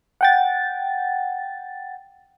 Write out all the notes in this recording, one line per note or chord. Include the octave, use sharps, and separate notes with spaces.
F#5 G5 A6